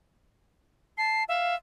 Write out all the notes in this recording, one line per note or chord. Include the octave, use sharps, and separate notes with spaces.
A5 C7
E5 F5